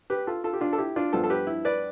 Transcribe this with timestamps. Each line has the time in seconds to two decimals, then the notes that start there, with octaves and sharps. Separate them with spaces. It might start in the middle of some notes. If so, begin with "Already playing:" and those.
0.10 G4 B4
0.27 F4 A4
0.44 F4 A4
0.53 G4
0.61 D4 F4
0.73 A4
0.78 E4 G4
0.96 D4 F4
1.13 G2 F3 B3 D4 F4 A4
1.24 A4
1.30 G4 B4
1.47 E4
1.65 B4 D5